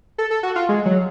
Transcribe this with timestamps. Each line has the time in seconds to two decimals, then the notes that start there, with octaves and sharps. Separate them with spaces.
0.18 A4
0.31 A4
0.43 F#4
0.56 F4
0.69 G#3
0.86 F#3